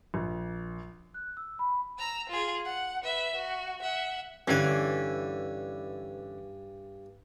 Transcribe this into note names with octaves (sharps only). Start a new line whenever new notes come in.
A#1
F#6
E6
B5
A#5 E6
F4 G#4
F#5
B4 E5
F#4
E5 F#5
G2 D3 E3 C#4 G#5